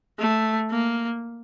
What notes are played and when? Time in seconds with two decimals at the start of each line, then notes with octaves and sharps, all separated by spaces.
0.19 A3
0.71 A#3